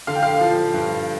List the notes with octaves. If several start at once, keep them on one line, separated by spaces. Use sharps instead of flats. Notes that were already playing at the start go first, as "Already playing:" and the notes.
D3 F5
G5
F5
F3
G2